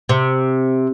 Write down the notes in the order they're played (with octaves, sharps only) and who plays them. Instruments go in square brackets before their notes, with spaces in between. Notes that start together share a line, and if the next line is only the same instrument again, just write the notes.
[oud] C3